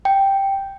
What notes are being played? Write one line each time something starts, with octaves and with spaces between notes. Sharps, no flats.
G5